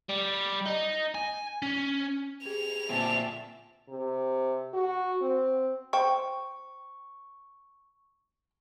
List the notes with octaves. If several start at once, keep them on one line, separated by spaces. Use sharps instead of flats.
G3
D#4
G#5
C#4
G4 G#4 G#6 F7
A#2 C4 D5 E5 G#5 A5
C3
F#4
C4
C5 G5 C#6